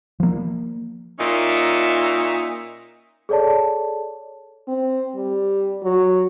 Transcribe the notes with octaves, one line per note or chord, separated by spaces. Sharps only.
F3 A#3
A#2 C#4 D#4 E5 A#5
G#4 A4 C#5 D5 A5
C4
G3
F#3